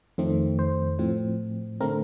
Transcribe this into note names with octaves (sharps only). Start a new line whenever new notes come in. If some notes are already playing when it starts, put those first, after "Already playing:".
F2 D#3 A3 C4
C5
A2 F3 C4
D3 A3 C4 A#4